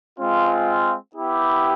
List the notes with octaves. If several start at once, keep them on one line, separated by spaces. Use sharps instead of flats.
G#3 C4 F4
B3 E4 G4